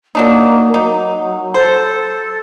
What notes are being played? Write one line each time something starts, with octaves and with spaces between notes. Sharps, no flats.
F#3 A#3 D4 D#4
F#3 D#4
A4 C5